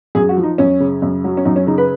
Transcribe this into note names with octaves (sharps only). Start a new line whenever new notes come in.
F#2 G#4
F#4
F3
D#4
F#2 C#4
C#3
F#2
F#3
C#4
F#2 D#4
C#4
C#3 D#4
B4